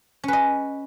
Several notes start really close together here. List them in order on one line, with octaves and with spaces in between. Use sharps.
C#4 B4 D#5